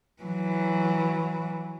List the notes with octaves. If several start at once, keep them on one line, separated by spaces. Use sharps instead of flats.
E3 F#3